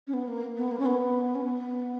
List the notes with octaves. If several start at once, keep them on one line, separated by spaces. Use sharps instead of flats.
C#4
B3
A#3
B3
A#3
C#4
B3
C#4
B3